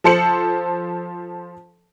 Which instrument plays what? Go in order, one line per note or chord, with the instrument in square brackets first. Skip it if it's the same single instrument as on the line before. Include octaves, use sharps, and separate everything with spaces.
[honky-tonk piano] F3 A4 C5 C#7 F#7